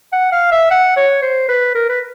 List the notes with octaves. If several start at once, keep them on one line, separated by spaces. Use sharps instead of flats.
F#5
F5
E5
F#5
C#5
C5
B4
A#4
B4